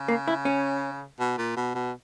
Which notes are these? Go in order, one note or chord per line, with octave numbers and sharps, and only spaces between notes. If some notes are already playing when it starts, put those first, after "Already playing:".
Already playing: C#3
A#3
E4
C#4
B2
A#2
B2
B2